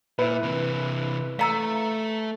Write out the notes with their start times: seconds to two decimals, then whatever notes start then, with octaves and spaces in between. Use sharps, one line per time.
0.19 A#2 E4 B4
0.43 C3 E3
1.39 A3 F5 A#5 E6